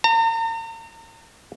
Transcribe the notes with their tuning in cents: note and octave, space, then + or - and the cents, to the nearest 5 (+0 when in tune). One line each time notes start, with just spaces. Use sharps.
A#5 -40